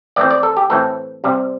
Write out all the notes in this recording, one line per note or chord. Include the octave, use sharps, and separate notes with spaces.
A2 E3 C4 D5
D5
A4
G4
A2 E3 C4 A4
C3 G3 C4